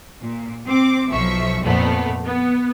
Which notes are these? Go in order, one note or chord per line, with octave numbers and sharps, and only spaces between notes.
A#2
C4 D6
B1 F3 E5 C#6
F2 A#2 A3 B3
B3